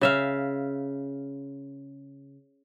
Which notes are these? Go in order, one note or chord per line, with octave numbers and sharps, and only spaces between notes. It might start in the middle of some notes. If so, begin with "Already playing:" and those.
C#3 E5 F5